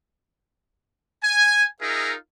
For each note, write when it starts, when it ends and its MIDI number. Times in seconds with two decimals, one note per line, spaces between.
1.23 1.65 80
1.82 2.14 63
1.82 2.14 65
1.82 2.14 68
1.82 2.14 70
1.82 2.14 75
1.82 2.14 76